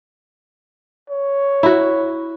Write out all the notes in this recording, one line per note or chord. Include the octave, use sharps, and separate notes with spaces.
C#5
E4 F#4